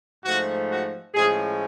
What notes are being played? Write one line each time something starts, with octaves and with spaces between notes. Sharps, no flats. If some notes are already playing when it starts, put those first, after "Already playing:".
G#2 F3 A3 F#4
F#4
A2 F3 G#3 C#4 G#4